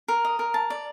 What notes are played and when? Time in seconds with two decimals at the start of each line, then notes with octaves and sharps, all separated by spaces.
0.08 A#4
0.25 D#5
0.39 A#4
0.54 A5
0.70 D5